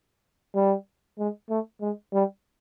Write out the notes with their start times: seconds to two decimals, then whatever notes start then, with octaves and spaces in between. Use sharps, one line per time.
0.55 G3
1.18 G#3
1.49 A3
1.81 G#3
2.13 G3